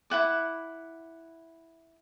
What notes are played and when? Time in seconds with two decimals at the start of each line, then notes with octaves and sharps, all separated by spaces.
0.10 E4 F4 F#5 D6